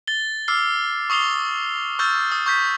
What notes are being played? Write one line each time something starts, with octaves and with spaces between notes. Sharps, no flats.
A6 G7
D6 E6 F6 C7
C#6 D#6 C7 F7 G7
C#6 E6 F6 G6 A6
D#6
C#6 G6 B6